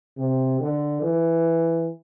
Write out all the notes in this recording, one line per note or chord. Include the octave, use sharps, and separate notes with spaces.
C3
D3
E3